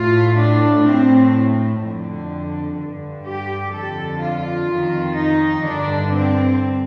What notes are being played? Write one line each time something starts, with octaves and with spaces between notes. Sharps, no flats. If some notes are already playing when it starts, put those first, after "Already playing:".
Already playing: A2 F4
D4
A2 C4
F2 D3
G2 D3
G4
F2 D3 A4
F4
F2 D#3
D#4
G2 D3 D4
C4